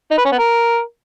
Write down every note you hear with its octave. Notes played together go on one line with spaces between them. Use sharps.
D#4
B4
C#4
B3
A#4